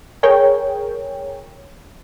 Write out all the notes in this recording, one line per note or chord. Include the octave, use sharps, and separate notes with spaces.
G#4 A#4 C#5 G5